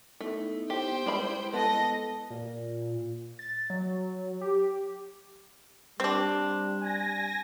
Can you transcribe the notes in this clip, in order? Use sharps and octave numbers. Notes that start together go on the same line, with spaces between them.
A3 B3 D#4 E4
G4 C5 G5
G3 G#3 E4 G#4 B4 B5
B3 A4 D#5 A#6
A#2
A6
F#3
G4
G3 C4 D4
G#5 A#6